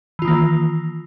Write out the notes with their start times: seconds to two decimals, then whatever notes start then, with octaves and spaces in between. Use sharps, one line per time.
0.19 E3
0.22 F4
0.25 D#3
0.28 A#3